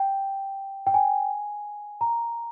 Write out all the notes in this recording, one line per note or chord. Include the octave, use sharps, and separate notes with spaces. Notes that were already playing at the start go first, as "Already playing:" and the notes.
Already playing: G5
G5
G#5
A#5